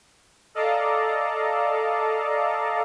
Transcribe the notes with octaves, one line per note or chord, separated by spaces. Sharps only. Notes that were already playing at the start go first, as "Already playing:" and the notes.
A4 D5 D#5 F5 A5 A#5